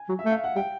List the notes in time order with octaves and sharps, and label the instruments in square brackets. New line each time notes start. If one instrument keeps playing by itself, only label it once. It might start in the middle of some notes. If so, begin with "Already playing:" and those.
Already playing: [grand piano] G#5
[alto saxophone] F#3
[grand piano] E5
[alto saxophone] A3
[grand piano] F5
F#5
[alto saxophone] G3 [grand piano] G5